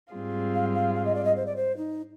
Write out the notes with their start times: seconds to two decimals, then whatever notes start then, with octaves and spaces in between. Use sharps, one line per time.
0.13 G#2 G3 C4 F4 G#4
0.55 F5
0.75 F5
0.95 F5
1.05 D#5
1.15 D5
1.24 D#5
1.36 C5
1.46 D5
1.56 C5
1.77 D#4